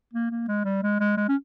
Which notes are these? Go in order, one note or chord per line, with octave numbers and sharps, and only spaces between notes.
A#3
A#3
G#3
G3
G#3
G#3
G#3
C#4